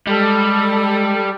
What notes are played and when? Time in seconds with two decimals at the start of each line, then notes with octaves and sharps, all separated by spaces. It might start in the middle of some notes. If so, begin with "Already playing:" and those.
0.07 G3 G#3 A4